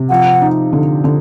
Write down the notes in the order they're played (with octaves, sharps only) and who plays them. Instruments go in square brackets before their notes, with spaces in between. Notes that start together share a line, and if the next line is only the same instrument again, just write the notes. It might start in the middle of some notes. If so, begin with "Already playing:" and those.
Already playing: [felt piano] C3
[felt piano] F3 [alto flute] F#5
[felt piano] D#4
D3
D3